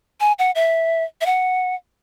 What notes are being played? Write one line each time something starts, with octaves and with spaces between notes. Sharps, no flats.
G#5
F#5
E5
E5
F#5